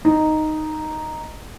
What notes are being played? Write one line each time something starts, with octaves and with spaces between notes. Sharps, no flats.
D#4